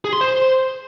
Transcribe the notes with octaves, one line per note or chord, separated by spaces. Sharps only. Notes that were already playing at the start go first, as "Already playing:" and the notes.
G#4
C6
C5